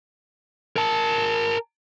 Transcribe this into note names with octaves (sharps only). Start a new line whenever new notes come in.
A#4 A5